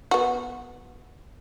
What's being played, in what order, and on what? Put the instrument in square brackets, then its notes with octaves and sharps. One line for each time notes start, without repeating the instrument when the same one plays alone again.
[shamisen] B3 F#4